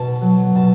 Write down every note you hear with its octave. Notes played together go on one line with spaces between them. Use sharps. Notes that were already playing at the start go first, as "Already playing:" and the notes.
Already playing: B2 A5
F#3
B2 A5